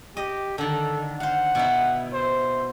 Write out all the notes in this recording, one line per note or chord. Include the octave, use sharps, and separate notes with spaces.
G4 D#5
D3 D#3 A4
C5 F5 F#5
B2 D#4 E4
C5